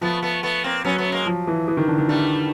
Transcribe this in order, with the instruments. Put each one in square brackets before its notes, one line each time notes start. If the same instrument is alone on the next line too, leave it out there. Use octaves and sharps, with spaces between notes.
[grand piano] F3 [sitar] A3 B3
[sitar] A3 B3
A3 B3
A#3 C4
[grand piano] F#3 [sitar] B3 C#4
[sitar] A3 B3
G#3 A#3
[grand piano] F3
E3
E3
D#3
D3
D#3
[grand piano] D3 [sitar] G3 A3